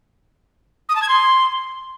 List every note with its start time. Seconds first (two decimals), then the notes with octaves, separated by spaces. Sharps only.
0.89 D#6
0.96 A5
1.02 G#6
1.09 C6